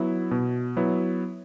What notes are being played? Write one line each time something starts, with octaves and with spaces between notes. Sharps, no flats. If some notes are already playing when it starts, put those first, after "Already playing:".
Already playing: F#3 B3 E4
B2
F#3 B3 E4